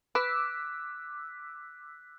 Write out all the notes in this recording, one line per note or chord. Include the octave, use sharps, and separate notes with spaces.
B4 D6 E6 F#6 B6